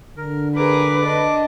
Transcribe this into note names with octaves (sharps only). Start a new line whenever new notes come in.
D3 A#4
G#4 A#4 B4 D6
D4 D#5